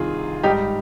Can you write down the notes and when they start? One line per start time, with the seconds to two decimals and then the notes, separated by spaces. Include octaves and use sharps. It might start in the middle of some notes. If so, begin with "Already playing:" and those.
Already playing: C2 C3 D#3 F4 G#4
0.44 G#2 G3 D#4 G4